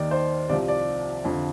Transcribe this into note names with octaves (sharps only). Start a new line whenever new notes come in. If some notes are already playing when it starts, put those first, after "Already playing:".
Already playing: D#2 D#3 D5
C5
C2 C3 F3 D5
D5
F2 D3 F3